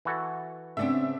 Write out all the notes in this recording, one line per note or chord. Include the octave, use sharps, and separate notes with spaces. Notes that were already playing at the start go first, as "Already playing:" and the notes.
E3 F#4 A4
C#3 B3 C4 D4 E5